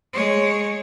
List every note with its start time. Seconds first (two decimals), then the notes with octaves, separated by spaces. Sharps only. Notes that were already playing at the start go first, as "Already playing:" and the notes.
0.13 G#3 C#5